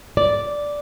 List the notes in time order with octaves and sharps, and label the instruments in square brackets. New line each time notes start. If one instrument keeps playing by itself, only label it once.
[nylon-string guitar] D5